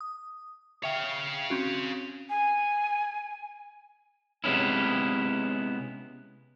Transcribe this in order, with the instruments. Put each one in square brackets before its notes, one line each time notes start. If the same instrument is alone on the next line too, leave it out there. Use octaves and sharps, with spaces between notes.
[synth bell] D#6
[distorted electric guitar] C#5 F5 [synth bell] E5 G5
[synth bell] C4 C#4 F#4
[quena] G#5
[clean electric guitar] C3 G#3 B3 C#4 E4